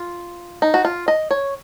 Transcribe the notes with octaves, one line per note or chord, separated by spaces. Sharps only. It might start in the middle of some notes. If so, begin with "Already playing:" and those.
Already playing: F4
D#4
F#4
F4
D#5
C#5